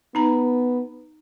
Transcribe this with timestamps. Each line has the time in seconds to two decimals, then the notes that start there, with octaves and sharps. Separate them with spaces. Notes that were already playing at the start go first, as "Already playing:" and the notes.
0.15 B3 D#4 A#5